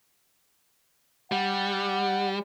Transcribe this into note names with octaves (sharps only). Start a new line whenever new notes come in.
G3 F#5